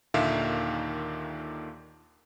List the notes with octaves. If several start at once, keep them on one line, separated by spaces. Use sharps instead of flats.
D#2 A#2 D3 D#3 E5 F5